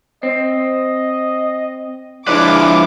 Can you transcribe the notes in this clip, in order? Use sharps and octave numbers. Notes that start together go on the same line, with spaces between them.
C4 D#5
F3 G#3 D4 E4 B4 D5 D6